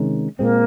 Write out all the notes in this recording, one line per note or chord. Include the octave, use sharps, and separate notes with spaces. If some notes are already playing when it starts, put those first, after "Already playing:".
Already playing: C3 D#3 G#3 C#4
A#2 G#3 A#3 C4